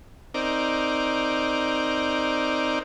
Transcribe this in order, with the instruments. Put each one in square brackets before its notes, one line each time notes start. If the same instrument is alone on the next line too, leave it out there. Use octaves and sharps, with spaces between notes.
[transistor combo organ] C4 D#4 A#4 D5